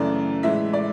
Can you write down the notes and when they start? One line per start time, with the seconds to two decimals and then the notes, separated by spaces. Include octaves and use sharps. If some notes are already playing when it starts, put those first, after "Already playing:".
Already playing: F#2 C#3 E3 A3 D5
0.43 A2 E3 G#3 E5
0.73 D5